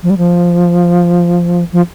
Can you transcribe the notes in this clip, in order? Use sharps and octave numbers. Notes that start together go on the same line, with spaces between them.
F3
G3
F3
F3